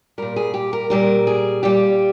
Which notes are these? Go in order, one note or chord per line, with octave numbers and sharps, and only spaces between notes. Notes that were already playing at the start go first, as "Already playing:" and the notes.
A#2 G3 A#4
G#4
G4
A#4
A#2 G3 A#4
G#4
A#2 G3 G4